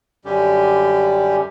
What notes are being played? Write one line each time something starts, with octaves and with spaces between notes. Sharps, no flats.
F#2 D3 G3 C#4 G4